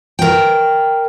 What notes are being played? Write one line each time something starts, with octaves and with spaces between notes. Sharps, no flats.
A#4 G5